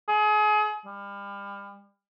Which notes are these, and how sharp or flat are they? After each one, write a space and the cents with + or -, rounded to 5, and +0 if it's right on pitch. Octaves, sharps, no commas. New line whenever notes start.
G#4 +35
G3 +35